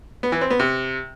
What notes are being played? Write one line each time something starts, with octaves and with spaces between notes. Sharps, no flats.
B3
E3
C4
B3
C3